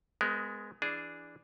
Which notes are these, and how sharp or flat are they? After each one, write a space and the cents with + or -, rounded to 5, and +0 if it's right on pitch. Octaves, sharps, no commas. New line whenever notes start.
G#3 +0 B3 +30 A#4 +0
E3 +15 D4 +0 G#4 +0